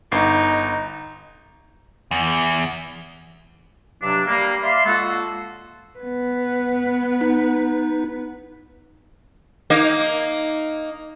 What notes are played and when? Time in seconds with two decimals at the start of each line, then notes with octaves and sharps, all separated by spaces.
0.12 G1 D#4 C7
2.11 E2
4.02 G2 C3 F#3 D4
4.26 G3 A#3
4.63 D5 E5 F5 B5 C6
4.85 D3 G#3 A#3 F4 F#4 A4
6.00 B3 B4
7.21 D#4
9.70 A#3 D#4